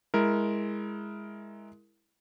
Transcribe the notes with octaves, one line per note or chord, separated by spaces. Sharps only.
G#3 E4 A#4